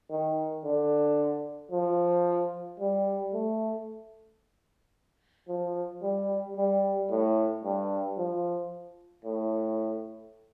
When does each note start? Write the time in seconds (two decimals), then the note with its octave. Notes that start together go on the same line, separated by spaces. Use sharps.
0.10 D#3
0.65 D3
1.71 F3
2.80 G3
3.33 A3
5.48 F3
6.02 G3
6.57 G3
7.10 A2
7.64 G2
8.18 F3
9.25 A2